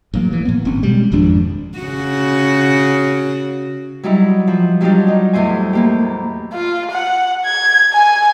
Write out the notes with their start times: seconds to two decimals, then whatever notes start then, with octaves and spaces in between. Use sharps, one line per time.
0.14 A1 F#3 A#3
0.33 E3
0.45 A2 F#3 A#3 B3
0.65 G#1 C4 C#4
0.82 B2 G3 G#3
1.12 G#1 F2 G#2 D4
1.79 C#3 F#4
4.03 F#3 G3 D#4 E4
4.48 F3
4.81 F#3 G3 D4 D#4 F4 G4
5.08 D#4
5.33 E2 A2 E4 C5 G#5
5.73 A2 A#3 G4
6.53 F4
6.92 F#5
7.46 G#6
7.93 G#5